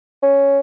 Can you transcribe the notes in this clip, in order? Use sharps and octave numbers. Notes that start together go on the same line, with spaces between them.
C#4